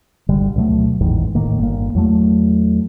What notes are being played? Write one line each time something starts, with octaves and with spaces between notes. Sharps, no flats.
G#1 D3 G3
D2 B2 F#3 A3
A1 E2 G#2 D#3
D#1 A2 D#3 A#3
G1 A#3
E2 F#3 A3